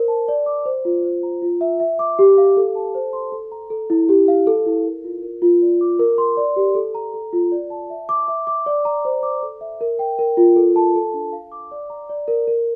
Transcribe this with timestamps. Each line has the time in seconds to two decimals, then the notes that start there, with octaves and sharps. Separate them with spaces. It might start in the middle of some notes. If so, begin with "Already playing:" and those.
Already playing: A#4 C5
0.08 A5
0.28 D5
0.46 D6
0.66 C5
0.85 F4
1.04 C5
1.23 A#5
1.42 F4
1.61 E5
1.80 E5
1.99 D6
2.19 G4
2.38 F5
2.57 A4
2.75 A5
2.95 C5
3.13 C6
3.32 A4
3.52 A#5
3.70 A4
3.90 E4
4.09 G4
4.28 F5
4.47 A4
4.66 E4
4.85 A#4
5.04 F4
5.23 A#4
5.42 F4
5.62 D5
5.81 D6
5.99 A#4
6.18 C6
6.37 D5
6.56 G4
6.75 A4
6.95 A#5
7.14 A4
7.33 F4
7.52 D5
7.70 A5
7.90 E5
8.09 D6
8.28 E5
8.47 D6
8.66 D5
8.85 A#5
9.05 C5
9.23 D6
9.43 A4
9.61 E5
9.81 A#4
9.99 G5
10.19 A#4
10.37 F4
10.56 A4
10.76 A5
10.95 A4
11.14 D4
11.33 F5
11.52 D6
11.71 D5
11.90 A#5
12.10 D5
12.28 A#4
12.48 A#4